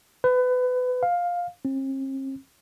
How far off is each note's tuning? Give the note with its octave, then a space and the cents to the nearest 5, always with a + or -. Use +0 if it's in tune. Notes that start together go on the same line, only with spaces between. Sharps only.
B4 +25
F5 +10
C4 +45